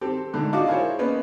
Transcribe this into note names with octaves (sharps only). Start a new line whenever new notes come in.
C4 G4 A4
G#2 D3 A3
D4 D#4 F4 F#4 D6
E4 F4 G#4 A#4 C5 C#5
A#3 B3 C#4 D#4 B4